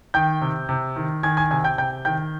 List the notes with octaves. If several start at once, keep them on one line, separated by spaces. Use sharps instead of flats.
D#3 G5 G6
C3
C3
D#3
D#3 G#5 G#6
G#5 G#6
C3 G#5 G#6
G5 G6
C3 G5 G6
D#3 G5 G6